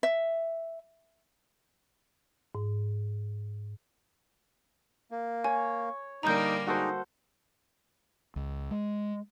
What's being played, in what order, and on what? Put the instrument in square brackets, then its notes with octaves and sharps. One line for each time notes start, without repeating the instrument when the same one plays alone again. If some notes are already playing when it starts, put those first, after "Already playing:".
[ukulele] E5
[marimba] G#2
[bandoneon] A#3
[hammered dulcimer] C#5 [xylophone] G#5
[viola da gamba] D3 G3 A#3 [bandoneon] D#4 [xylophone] A#5 G6
[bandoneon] G#3 D#4 [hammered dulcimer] F#4 A4 C5
[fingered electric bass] C#2
G#3